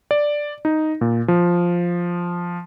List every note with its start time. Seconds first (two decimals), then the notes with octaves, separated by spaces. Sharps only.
0.11 D5
0.65 D#4
1.01 A#2
1.28 F3